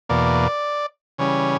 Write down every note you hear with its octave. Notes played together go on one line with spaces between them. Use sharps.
E2 B2 A#3 D5
C#3 E3 G3 C#4 C#5